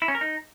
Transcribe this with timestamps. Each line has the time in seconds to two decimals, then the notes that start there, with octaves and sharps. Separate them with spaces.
0.02 E4
0.08 C#4
0.15 A#4
0.21 D#4